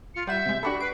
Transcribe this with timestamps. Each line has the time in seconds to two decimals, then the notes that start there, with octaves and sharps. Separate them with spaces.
0.15 F4 C#7
0.27 G3 E5 F#5 G6 E7
0.46 C3 G#3
0.63 D4 F#4 G4 A4 B5
0.80 B4 C7 D7